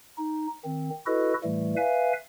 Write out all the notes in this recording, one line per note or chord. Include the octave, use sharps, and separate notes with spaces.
D#4
D#3 C4
E4 F#4 A4 B4 D#5
A2 E3 G3 A3
B4 E5 F5 G#5